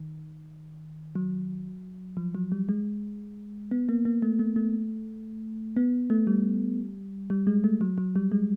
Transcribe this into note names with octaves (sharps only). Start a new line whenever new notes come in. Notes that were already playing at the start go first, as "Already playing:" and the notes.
Already playing: D#3
F#3
F3
F#3
G3
G#3
B3
A#3
A#3
A3
A3
A3
B3
A3
G3
G3
G#3
A3
F#3
F#3
G3
G#3